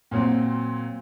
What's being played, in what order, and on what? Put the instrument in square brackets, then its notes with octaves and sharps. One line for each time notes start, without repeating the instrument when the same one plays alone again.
[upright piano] A#2 F#3 C4